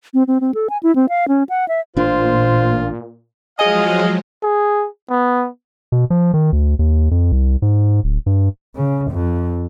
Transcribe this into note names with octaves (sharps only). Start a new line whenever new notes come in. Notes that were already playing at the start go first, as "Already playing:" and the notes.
C4
C4
C4
A4
G#5
E4
C4
F5
C#4
F#5
E5
A1 A#2 D4 F4 C5
F3 F#3 G#3 G#4 D#5 F5 G#5
G#4
B3
B2
F3
D#3
D2
D#2
F2
C2
G#2
D1
G2
C#3
F2